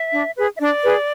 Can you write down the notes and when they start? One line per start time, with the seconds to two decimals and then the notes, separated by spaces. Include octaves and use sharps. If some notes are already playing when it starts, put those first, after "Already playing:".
Already playing: E5
0.13 D4
0.36 G#4 B4
0.56 E5
0.59 D4 D5
0.83 G#4 B4